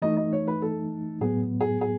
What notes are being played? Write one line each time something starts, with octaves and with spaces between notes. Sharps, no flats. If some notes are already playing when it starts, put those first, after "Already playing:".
E3 A3 D#4 D#5
D#5
C#5
B4
A4
A2 F#3 B3 G#4
G#4
G#4